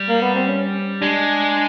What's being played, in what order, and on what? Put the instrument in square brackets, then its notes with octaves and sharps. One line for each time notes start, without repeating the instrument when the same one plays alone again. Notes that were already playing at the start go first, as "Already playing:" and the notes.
Already playing: [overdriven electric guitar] G3
[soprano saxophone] A#3
B3
C4
C#4
[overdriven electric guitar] G#3 [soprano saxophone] D4